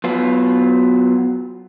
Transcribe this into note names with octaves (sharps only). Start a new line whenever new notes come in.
F#3 B3 F4